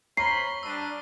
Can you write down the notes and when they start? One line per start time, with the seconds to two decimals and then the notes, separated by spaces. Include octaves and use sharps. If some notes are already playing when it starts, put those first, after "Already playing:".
0.17 C5 C#5 A#5 B5 C#6 F6 C7 G7
0.63 G3 D4 E6 D#7